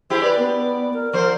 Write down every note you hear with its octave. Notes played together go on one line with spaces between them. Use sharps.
E4 G4 G#4 C5
B4 D5
B3
A#4
F3 A#4 C5